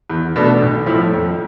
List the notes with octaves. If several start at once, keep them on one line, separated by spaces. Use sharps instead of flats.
E2
B2 A3 D4
B1
A2 F3 A3 E4
F2